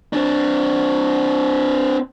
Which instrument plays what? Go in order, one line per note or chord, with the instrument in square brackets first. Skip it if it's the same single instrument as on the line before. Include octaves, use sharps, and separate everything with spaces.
[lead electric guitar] C4 D4